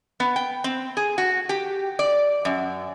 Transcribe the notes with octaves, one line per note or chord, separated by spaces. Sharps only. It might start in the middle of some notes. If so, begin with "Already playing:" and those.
B3
G5
C4
G#4
F#4
G4
D5
F#2